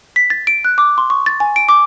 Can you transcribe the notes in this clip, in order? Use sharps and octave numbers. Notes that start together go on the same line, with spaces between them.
B6
A6
D7
F#6
D6
C6
C#6
A6
G#5
D7
D6